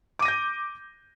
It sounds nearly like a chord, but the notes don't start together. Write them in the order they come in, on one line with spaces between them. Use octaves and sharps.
D6 D#7 A#6 G6